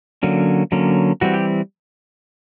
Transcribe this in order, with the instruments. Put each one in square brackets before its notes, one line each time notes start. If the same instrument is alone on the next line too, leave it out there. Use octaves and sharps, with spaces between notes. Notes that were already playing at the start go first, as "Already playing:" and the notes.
[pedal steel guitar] D3 F#3 A#3 C#4
D3 F#3 A#3 C#4
E3 G3 C4 F#4
G4